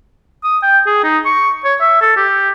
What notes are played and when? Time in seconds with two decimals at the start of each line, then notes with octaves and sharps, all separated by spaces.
0.44 D#6
0.63 G5
0.87 G#4
1.04 D#4
1.26 C#6
1.65 C#5
1.81 E5
2.02 A4
2.17 G4